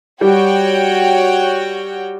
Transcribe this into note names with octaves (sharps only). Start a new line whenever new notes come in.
G3 F#4 C#5 G5